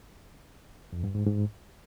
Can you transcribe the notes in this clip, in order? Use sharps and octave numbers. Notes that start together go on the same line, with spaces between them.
F2
G2
G#2
G#2